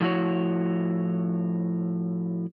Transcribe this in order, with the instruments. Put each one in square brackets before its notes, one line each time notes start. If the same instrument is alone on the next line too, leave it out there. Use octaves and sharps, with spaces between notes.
[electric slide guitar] A2 F3 E4 F#4 C#5